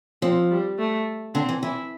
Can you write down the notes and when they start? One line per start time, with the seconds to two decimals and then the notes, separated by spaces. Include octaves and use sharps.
0.22 F3 C4
0.51 G3
0.78 A3
1.35 D3 C4
1.49 E3
1.63 E3 E4